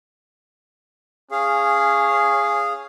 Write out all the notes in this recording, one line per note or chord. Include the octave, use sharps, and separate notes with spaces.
C#4 G#4 F5